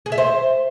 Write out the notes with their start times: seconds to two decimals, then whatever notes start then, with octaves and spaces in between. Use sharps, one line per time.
0.06 G#4
0.12 E5
0.18 C5